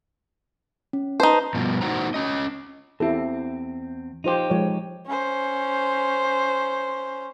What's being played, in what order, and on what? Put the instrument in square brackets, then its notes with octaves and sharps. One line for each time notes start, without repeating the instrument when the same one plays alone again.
[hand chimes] C#4
[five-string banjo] D#4 C5 [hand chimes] B4 A5
[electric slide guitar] G2 B2 F3
A2 C#4 D#4 F#4 C5 A#5
C#4 D#5
[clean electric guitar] E2 C4 [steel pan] E4 G4 A4
[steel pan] F3 F4 C5 [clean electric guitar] D#4 G4
[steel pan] F3 G#3 C#5
[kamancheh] C#4 C5